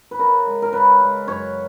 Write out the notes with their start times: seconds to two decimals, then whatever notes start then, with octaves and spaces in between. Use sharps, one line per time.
0.11 B4
0.19 C#3 A#4
0.47 G#3
0.62 A#4
0.73 C#3 B4
1.01 G#3
1.27 F#2 C#5